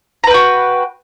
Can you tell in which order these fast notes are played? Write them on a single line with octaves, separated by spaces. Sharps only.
A#5 B4 G5 F#4